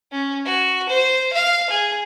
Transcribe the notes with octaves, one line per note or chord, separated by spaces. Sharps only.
C#4
F#4
C5
F5
G#4